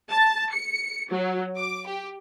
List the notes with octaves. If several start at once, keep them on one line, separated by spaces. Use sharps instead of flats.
A5
C#7
F#3
D6
G4